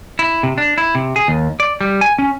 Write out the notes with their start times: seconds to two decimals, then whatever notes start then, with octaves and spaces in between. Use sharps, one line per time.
0.19 E4
0.43 C3
0.58 D4
0.78 E4
0.95 C3
1.16 G#4
1.28 D#2
1.60 D5
1.81 G3
2.01 G#5
2.19 C#4